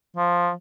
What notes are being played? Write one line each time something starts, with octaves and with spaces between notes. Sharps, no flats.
F3